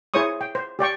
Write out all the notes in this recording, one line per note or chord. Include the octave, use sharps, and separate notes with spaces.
E4 G#4 C5 C#5 C#6 D#6
G5
C5
G4 D5 G5 C#6